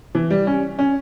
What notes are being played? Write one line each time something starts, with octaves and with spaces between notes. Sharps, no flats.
E3
G3
C#4
C#4